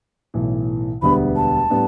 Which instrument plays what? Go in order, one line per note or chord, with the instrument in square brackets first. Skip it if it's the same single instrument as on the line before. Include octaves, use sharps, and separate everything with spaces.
[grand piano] B1 A2 E3
[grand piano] E1 D2 D3 G3 B3 [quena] B5
[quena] A5
[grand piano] A2 G3 B3 D4